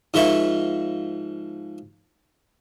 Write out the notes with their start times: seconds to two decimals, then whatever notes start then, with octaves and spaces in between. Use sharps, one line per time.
0.14 G#2 F3 F4 A#4 E5 C#6